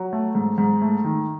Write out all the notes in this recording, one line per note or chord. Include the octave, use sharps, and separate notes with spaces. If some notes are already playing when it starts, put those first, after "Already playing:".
Already playing: F#3
A3
G#2
G#2
A3
D#3